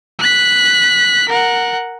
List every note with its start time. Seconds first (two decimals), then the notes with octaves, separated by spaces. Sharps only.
0.19 F#6 B6
1.29 A#4 F#5